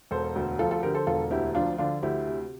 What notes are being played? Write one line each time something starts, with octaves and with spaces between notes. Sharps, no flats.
E1 A4 C5
D2
F3 F4 A4
F4 A4
D3 G4 A#4
A4 C5
E1 F4 A4
D2 E4 G4
F3 D4 F4
D3 D4 F4
D2 E4 G4
C3